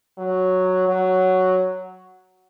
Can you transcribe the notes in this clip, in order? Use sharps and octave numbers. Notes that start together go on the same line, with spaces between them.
F#3
F#3